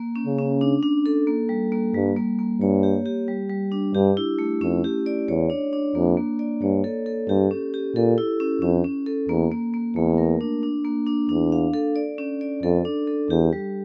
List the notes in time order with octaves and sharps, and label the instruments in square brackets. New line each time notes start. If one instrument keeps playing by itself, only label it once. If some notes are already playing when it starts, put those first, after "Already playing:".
Already playing: [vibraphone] A#3
C#4
[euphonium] C#3
[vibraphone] C#4
D4
D4
A4
A#3
G3
A#3
[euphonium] G2 [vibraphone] G3
[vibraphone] A#3
A#3
[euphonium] G2 [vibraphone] C#5
[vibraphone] G4
G4
G3
G3
D4
[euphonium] G2 [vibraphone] G4
[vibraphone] E4
A3
[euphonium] F2 [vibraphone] C#4
[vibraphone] G4
D5
[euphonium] E2 [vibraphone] C#5
[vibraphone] D4
D4
[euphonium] F2 [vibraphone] A#3
[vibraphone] A#3
D5
[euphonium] G2 [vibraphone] C#5
[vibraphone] A4
A4
[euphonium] G2 [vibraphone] G4
[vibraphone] C#4
G4
[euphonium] A#2 [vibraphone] A4
[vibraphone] E4
C#4
[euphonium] F2 [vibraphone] C#4
[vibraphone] C#4
A4
[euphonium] E2 [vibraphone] A#3
[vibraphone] A#3
A#3
[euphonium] E2 [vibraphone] A3
[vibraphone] A#4
D4
D4
A#3
D4
[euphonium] E2 [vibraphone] D4
[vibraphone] F5
A4
D5
C#4
D5
[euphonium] F2 [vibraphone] A4
[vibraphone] D4
A4
[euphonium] E2 [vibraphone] G4
[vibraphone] G3